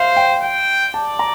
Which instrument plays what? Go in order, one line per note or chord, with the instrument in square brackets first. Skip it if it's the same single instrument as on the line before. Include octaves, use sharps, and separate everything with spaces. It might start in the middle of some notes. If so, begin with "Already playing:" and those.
Already playing: [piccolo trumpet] C5 [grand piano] E5 F5
[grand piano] G5
[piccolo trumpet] G5
[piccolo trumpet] D5 [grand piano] A5
[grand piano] A#5